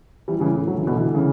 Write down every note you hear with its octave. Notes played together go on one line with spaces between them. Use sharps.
E3 G3
C#3 E3
A2 C#3
D3 F#3
C#3 E3
B2 D3
E3
D3
C#3 E3